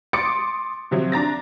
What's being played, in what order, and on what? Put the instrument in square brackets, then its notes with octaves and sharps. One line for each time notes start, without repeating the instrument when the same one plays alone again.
[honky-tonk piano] C6 D6 D#6 A6 C#7 D7
C3 F3 F#3
D4 A#5 A6 A#6